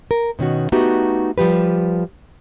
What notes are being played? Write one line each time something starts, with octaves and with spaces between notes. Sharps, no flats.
A#4
B2 D#3 C#4 F#4
A3 B3 D#4 F#4 G4
F3 G3 G4 B4